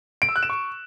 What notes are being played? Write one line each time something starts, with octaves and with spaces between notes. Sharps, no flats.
D7
E6
F#6
E7
C#6